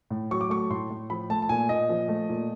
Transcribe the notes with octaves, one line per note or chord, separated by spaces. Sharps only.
A2
F#3 C#6
D6
A3 C#6
A2 C6
A2
F3 B5
A3 A5
A5
A#2 G#5
A#2 D#5
F3
A3
A#2